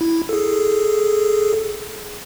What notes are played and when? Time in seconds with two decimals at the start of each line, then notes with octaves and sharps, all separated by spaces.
0.01 E4
0.29 G#4 A4